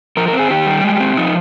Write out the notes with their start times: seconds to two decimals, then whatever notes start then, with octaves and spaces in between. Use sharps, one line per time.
0.17 F3 A#4
0.28 A#4
0.33 C4
0.39 G#4
0.50 D#3 G4
0.67 G3
0.84 G#3
1.00 C4
1.17 F3 D#4